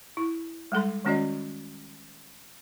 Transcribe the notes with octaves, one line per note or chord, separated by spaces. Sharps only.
E4
G3 G#3 A4 C6
D#3 G#3 C#4 F#4 D5 D#5